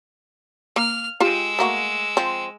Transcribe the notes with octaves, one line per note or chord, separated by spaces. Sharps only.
A#3 F6
G#3 F4 G4 G5 E6
A3 A#3 F#4
F3 C4